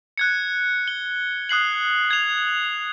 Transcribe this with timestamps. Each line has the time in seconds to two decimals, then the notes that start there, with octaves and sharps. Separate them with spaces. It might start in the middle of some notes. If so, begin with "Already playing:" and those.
0.18 F#6 G#6 C#7
0.88 G7
1.49 D#6 F#6 C7 F#7
2.11 G#6 F7